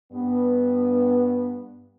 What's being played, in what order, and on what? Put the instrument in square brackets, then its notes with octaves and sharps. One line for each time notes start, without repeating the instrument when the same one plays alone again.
[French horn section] G2 B3